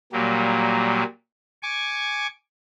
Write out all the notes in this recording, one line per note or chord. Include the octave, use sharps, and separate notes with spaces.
A#2 F#3 G3 A#3
G#5 C#6 D6